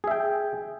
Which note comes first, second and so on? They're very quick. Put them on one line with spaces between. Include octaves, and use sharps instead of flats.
G#4 E5 G5